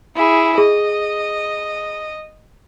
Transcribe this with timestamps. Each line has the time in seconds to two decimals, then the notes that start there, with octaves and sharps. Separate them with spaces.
0.16 E4 G#4
0.58 G#4 D#5